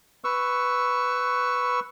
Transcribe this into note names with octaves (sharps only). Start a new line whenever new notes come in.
B4 C#6 E6